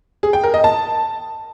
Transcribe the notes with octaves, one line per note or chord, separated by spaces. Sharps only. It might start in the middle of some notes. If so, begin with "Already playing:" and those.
G#4
G5
A#4
D#5
A5